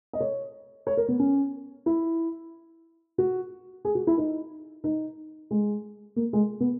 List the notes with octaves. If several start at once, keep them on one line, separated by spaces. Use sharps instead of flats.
D#5
C#5
C#5
A#4
B3
C#4
E4
F#4
G#4
F#4
E4
D#4
D#4
G#3
A#3
G#3
B3